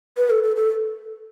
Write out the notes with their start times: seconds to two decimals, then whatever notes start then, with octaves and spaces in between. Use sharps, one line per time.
0.17 B4
0.30 A4
0.43 A4
0.56 A4